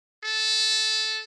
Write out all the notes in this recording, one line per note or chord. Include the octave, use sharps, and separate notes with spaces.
A4